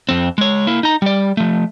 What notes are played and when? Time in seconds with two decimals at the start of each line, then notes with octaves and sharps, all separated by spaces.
0.09 F2 C4
0.38 G#3 C#5
0.67 A#3 E4
0.83 D#4 A#5
1.02 G3 D5
1.37 F3 A3